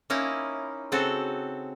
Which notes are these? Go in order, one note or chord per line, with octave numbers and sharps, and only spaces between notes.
A#3 C#4 D#4 E4
C#3 C4 F#4 A4